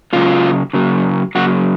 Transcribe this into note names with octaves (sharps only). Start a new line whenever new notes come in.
C#3 F#3 A#3 F4
C#3 F#3 A#3
C#3 F#3 A#3 F#4